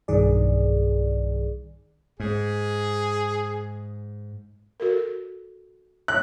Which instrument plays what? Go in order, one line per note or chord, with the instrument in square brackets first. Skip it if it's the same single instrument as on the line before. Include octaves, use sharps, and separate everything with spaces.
[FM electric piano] B1 G2 D#3 G#4 D5
[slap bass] G#2 [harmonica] G#4
[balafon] F#4 A4 A#4
[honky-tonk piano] F#6